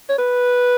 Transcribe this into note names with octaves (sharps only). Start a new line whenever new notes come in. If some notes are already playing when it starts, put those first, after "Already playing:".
C#5
B4